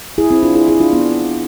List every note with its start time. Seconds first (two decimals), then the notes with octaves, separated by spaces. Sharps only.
0.18 E4 G#4
0.31 C4 E4
0.43 D4 F4
0.55 E4 G#4
0.68 E4 G#4
0.80 D4 F4
0.93 B3 D4